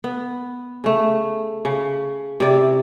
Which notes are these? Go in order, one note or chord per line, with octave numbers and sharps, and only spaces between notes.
B3
C#3 A3
C#3
C3 E4 D5